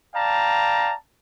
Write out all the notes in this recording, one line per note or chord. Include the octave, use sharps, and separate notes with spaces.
D5 F5 G5 A5 A#5